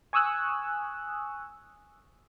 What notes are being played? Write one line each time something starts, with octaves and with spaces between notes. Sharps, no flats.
G#5 C#6 D#6 E6 F#6